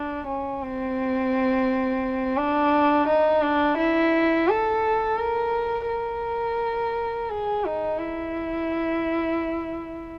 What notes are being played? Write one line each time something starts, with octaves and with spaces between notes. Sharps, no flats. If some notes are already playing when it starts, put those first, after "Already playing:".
Already playing: D4
C#4
C4
D4
D#4
D4
E4
A4
A#4
A#4
G#4
D#4
E4